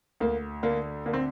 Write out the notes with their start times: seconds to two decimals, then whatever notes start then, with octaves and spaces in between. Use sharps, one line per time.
0.20 D2 A#3
0.63 D3 A#3
1.06 D3 A#3
1.13 C4